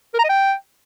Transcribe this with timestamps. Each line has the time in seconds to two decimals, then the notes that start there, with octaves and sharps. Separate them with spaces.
0.14 A#4
0.19 A#5
0.24 D#5
0.29 G5